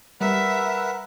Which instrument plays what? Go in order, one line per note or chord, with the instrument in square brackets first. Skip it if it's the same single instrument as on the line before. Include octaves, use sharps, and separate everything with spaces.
[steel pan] G3 [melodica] A#4 B4 F#5 [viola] E5